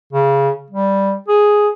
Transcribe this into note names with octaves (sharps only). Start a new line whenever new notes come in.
C#3
G3
G#4